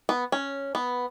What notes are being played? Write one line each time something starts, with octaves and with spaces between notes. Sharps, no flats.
B3
C#4
B3